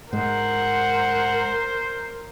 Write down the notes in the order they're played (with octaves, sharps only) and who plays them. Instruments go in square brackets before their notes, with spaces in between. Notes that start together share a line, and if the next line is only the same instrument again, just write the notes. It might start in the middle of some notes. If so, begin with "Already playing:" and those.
[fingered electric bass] G#2 G#3 [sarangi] A#4 [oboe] C5 [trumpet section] F#5